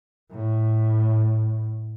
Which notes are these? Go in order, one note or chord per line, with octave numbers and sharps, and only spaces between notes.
A2